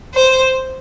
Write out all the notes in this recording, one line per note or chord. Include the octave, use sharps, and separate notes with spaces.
C5